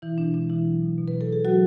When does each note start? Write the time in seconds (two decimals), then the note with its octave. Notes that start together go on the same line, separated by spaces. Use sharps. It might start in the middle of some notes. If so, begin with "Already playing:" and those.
0.02 B2 E3 E4
0.18 B2 D4
0.34 G#3 D4
0.49 B2 E3 E4
0.65 F#3
0.81 B2
0.98 B2
1.08 B4
1.14 F#3
1.21 A4
1.29 B2 G#4
1.45 F#3 G#3 F#4